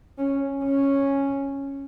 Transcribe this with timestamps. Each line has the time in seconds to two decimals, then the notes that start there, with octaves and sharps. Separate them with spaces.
0.18 C#4
0.64 C#4